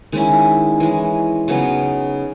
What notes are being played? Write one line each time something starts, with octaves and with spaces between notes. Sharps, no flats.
D#3 G#3 C#4 E4
E3 G#3 C#4
C#3 F#3 B3 D#4